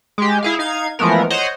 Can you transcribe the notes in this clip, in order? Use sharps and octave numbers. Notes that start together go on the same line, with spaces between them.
G#3 G4
E4 G#4 F5
D#4 F5 G#6
E3 F3 G#3 A3 B3 A#4
C5 C#5 D#5 F#5